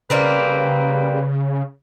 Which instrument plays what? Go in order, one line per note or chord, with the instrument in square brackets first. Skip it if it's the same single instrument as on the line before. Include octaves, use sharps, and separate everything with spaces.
[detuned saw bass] C#3 [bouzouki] G3 A#3 C4 [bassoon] B4